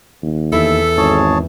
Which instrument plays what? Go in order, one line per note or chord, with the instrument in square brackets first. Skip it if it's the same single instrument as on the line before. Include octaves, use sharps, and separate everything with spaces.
[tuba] D#2
[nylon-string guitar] E2 E4 [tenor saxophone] A4 [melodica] E5
[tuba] G#1 [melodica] G#4 C#5 A5